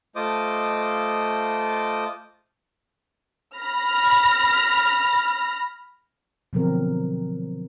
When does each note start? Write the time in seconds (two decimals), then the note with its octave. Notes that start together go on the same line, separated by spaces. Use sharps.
0.16 A3 F4 C5 D#5 D6 D#6
3.57 B5 F6 A#6
6.53 B2 D3 F3 F#3 C4 A#4